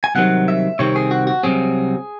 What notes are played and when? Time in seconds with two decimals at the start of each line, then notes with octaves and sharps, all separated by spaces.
0.04 G#5
0.15 C2 C3 D#3 F#3 C4 F#5
0.48 E5
0.79 C2 C3 D#3 C4 C#5
0.96 G#4
1.11 F#4
1.27 F#4
1.43 C2 C3 D#3 F#3 C4 G#4